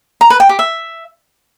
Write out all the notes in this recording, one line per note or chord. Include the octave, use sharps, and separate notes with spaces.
A#5
B4
G5
G4
E5